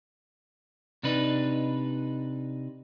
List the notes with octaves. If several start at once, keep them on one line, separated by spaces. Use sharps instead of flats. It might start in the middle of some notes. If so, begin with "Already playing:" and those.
C3 D4 D#4 B4